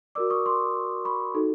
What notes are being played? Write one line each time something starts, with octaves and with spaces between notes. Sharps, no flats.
F#4 A#4 D5 D6 E6
C#6 D#6
C6 D6
B5 C#6
D#4 F#4 A4